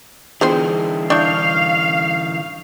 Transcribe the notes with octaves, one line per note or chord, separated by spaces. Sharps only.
D3 E3 B3 D4 F4 G#4 C5 G5
D4 E4 F5 C#6 D#6 G6